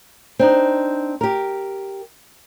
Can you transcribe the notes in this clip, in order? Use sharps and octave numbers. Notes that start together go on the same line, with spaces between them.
C4 D4 D#4
G4 A#4